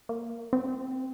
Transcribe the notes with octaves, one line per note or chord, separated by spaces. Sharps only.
A#3
C4